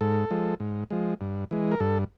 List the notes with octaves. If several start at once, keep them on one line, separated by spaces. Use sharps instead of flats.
G#2 A4
F3 G#3
G#2
F3 G#3
G2
E3 G#3
A#4
G2 A4